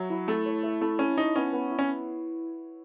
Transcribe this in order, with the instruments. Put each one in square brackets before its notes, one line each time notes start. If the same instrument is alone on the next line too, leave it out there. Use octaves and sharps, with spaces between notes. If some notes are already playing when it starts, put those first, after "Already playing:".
Already playing: [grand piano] F#3 [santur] C#5 E5
[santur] E4
[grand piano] A3 [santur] A4
[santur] C#5
E5
[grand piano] A3 [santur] E4
[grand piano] C#4 [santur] A4
[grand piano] D#4 [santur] C#5
[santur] B3 [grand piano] C#4
[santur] B3
E4
[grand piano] C#4